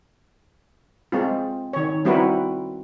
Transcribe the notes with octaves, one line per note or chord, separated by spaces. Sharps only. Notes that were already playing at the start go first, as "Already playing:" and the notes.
G#3 C4 F4
D#3 C#5
G3 C4 E4 F#4 A#4 B4